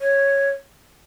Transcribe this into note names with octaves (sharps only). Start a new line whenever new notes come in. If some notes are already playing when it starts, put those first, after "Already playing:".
C#5